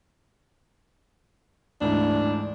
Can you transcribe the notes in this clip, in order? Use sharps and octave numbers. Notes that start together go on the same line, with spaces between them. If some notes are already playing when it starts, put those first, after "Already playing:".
D2 G#2 E3 D4